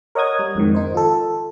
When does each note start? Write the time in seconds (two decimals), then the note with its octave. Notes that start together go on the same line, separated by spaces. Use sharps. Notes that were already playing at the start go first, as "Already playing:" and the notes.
0.15 A#4 C#5 D#5 F#5 D#6 G#6
0.39 G3
0.55 F2 G#2 D#3
0.74 D#3 D#4 C5
0.94 F4 A4